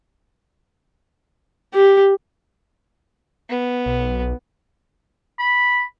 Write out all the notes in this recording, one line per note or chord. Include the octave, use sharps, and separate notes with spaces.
G4
B3
B1
B5